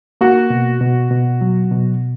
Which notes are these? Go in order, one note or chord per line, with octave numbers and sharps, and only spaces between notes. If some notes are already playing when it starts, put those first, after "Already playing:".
A#3 F#4
B2
B2
B2
F#3
B2